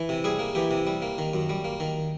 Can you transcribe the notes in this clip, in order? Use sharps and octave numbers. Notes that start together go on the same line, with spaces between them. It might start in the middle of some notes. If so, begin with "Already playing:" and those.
Already playing: E3
C3
G3 G#4
A#3
E3 G4
C3
G3
A#3
D#3
F#2
G3
A#3
D#3